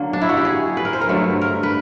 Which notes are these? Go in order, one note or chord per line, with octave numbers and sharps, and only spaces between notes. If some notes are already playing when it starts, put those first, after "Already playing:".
Already playing: D3 F#3 A#3
D4
E4
F#4
G4
G#4
B4
A#4
C5
A#4
G2 D3 F#3 A3
A#4
B4